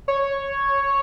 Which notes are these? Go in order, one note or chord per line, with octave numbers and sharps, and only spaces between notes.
C#5